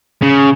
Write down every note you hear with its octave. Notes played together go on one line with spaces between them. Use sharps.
C#3